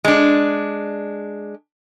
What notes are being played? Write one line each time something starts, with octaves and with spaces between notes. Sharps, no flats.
G#3 D4